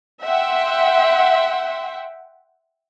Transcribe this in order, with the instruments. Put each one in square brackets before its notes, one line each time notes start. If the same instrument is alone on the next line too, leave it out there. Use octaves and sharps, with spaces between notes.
[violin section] E5 F#5 G5 C6